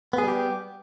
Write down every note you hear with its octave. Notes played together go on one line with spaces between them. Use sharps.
G3 B3 G4 G#4